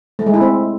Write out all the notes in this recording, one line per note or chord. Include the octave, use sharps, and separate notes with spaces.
A3
G#3
E4
C4